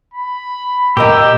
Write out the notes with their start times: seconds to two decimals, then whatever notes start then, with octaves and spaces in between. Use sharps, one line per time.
0.14 B5
0.97 A#2 G4 A#4 D#5 E6